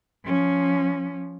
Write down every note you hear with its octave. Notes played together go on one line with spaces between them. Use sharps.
F3 C#4